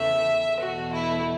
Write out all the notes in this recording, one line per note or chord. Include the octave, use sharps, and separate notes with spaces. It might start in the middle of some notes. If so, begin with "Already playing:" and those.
Already playing: E2 C#3 E3 A3 E5
E2 B2 A3 F#4
E4